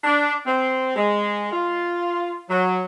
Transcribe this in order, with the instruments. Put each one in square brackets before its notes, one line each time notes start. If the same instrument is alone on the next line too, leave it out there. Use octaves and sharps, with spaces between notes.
[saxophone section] D4
C4
G#3
F4
F#3